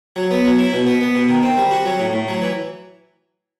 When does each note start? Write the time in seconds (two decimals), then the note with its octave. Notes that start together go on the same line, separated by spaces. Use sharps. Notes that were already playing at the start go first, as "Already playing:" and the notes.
0.16 F#3
0.31 B3
0.45 F#3
0.59 E4
0.73 B2
0.87 B3
1.01 B3
1.15 B2
1.29 D#3
1.43 C4
1.57 G3
1.71 F#4
1.86 F#3
1.99 A2
2.13 A2
2.28 F#3
2.41 E3